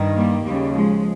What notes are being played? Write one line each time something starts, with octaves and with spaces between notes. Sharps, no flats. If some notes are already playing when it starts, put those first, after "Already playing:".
Already playing: G2 D#3
G3 A#3
D#2 C#3 G3
F3 G#3